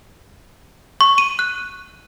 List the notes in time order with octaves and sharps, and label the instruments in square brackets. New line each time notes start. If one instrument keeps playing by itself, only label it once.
[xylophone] C#6
D#7
F#6